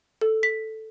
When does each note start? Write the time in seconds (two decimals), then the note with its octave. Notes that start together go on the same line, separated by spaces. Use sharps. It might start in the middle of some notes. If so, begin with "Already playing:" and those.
0.21 A4
0.43 B6